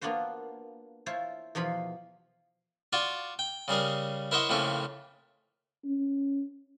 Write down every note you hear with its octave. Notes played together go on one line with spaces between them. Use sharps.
A#3 B3 D4 F4 F#4 C5
E4 F4 C5 C#5 A5
E2 B2 F3 F4 B5
F4 F#4 D5
G5
C#3 G3 G#4 A#4
E4 A#4 C5 C#5 D#5 F#5
F2 A2 C#3 A#3 C#4 E4
C#4